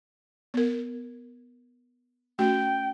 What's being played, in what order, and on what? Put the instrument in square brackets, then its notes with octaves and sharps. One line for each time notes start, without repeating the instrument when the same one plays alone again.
[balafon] B3 A#4
[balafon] A3 C#4 F#4 [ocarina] G5